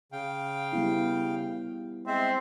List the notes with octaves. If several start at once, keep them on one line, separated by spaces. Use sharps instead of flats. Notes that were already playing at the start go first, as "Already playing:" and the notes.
C#3 F5 G5
G3 B3 E4
G#3 C4 C5 E5